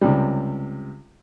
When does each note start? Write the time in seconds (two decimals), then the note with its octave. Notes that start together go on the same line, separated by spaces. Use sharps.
0.01 C#2 C3 G3